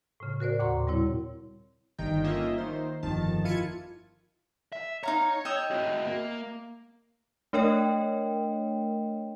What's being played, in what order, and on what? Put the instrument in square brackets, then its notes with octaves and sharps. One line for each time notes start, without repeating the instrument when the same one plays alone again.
[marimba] A2 C#3
F#4 A#4 C5 D5
D#2 A#2 F#5 A#5 C6 C#6
G3 C4 E4 C#5
[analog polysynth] G1 D#3 D#4 G5
A#3 C#4 F4 D#5 E5
D#3 C5
G1 F2 D#3 A5
A#3 E4 F4 G#5 C#7 D#7
[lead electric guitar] E5
[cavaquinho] D#4 F5 A#5 [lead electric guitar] C#5
[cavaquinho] D#5 E5 G5
[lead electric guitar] C4 F#4
A#3
[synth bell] A3 D4 A#4 C#5 D#5 G5